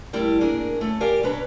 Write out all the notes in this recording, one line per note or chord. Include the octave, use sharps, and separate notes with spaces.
G3 A3 E4 A#4 G5
A2 A#3 D4 G#4 A#4
A3 C#4
G4 A#4 D5 F5 G#5
B2 C#4 D4 B4 A#5